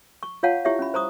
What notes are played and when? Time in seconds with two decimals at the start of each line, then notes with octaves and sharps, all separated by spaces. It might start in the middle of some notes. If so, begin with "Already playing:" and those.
0.23 C#6
0.43 F4 C#5 F5 F#5 A5
0.65 E4 G4 C#5 E5
0.79 C#4 B5
0.94 C5 A#5 C#6 D#6